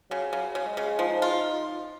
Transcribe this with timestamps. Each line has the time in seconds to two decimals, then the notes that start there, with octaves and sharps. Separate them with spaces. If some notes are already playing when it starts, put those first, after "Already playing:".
0.10 C#3 F#3
0.33 C#3 F#3
0.55 C#3
0.66 G#3
0.77 C#3
0.99 F3 D#4
1.22 F4